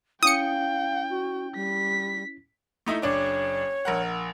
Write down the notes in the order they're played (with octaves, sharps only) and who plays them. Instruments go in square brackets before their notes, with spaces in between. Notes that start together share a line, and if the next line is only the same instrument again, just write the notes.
[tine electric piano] C#4 E4 [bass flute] F5 [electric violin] G5 [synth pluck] D#6 C#7
[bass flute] F#4
[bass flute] G3 [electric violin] B6
[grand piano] A3 D#4 E4
[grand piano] F#1 D4 D6 [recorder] C#5
[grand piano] A#1 A#4 F#5